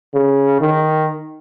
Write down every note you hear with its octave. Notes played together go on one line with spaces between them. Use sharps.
C#3
D#3